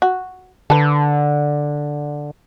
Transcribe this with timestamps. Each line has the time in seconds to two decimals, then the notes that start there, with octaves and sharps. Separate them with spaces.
0.02 F#4
0.70 D3 A4 B4